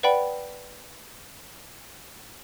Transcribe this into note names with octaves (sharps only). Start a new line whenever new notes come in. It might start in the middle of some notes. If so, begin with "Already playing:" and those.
B4 D5 F#5 G5 B5